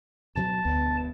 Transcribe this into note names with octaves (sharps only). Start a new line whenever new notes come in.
D2 B2 F#3 A5
E1 D2 G2 B3